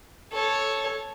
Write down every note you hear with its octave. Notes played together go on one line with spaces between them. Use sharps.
A4 C#5